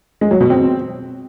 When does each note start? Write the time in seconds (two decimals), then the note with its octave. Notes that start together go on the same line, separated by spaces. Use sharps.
0.21 G#3
0.31 F#3
0.41 B2
0.50 C4